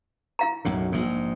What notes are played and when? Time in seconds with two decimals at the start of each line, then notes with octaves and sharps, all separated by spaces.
0.39 E4 F5 A#5
0.65 B1 F#2 A2
0.92 A#1 G#2